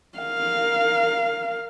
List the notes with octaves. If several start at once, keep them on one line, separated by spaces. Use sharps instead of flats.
A#4 F5